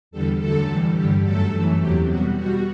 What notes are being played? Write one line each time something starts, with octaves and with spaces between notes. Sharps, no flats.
E2 D3 G3 A4
F#2 D3 F#3 A3 A4
A2 E3 G3
G2 D3 G3 G4
F#2 F#3 A3 A4
F#2 E3 A3
E2 C3 F#3 G4
B2 G3 F#4
B2 G3 F#4